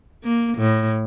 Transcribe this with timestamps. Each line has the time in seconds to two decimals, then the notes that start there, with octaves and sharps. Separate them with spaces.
0.24 A#3
0.58 A2